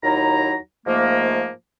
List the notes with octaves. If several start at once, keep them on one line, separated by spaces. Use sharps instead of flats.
D#2 F#3 D#4 E4 A#5
G#2 F3 A3 A#3